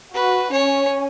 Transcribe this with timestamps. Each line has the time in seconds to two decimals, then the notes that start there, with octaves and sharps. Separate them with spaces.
0.14 F#4 B4
0.53 C#4 C#5